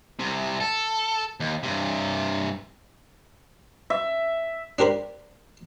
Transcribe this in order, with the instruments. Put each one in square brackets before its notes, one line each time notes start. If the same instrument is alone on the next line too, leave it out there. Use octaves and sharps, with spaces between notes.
[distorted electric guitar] C2 C3
A4
D#2
G2 C3
[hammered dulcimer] E5
[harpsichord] D4 G4 A#4 C5 B5